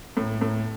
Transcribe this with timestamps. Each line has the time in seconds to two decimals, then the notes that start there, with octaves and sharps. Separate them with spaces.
0.17 A2
0.41 A2